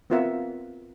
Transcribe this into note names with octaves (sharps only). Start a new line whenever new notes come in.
B3 C4 F4 A#4 E5 F#5